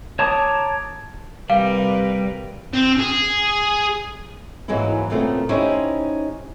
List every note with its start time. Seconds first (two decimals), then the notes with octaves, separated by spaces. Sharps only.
0.19 C#5 A5 A#5 D6 D#6
1.50 C3 G3 A#4 B4 F5
2.73 C4
2.99 G#4
4.68 G#2 E3 F#3 G#3 A#3 E4
5.10 A#2 C#3 A3 B3 C4
5.49 C#4 D#4 E4 G4 C5